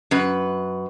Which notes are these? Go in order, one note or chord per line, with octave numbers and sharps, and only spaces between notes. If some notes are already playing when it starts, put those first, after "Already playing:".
F#2 B4